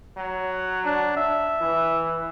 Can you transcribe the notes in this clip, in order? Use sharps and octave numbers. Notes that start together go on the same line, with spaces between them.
F#3
D4
E5
E3